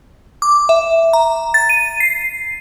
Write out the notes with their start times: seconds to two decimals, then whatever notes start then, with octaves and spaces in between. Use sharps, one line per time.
0.42 D6
0.69 E5
1.13 A#5
1.54 A6
1.69 D#7
2.00 C7